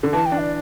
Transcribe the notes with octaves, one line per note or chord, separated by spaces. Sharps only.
D3
E3 A5
G5
D4
D5